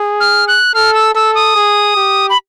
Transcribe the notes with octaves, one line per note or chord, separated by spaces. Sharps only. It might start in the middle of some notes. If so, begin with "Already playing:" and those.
Already playing: G#4
F6
F#6
A4 F6
E6
A4 E6
D#6
G#4
G4
B5